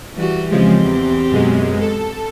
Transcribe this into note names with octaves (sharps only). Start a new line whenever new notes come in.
E3 G3 F#4
C#3 F3 G#3 C4 G4
E2
F#2 B2 G#3
A4